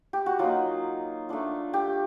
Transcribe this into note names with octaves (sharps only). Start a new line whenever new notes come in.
G4
F#4
F#3 A#3 D#4 F4
A3 D4 F4
G4